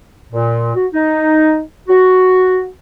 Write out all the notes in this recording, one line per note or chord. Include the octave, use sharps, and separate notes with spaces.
A#2
F#4
D#4
F#4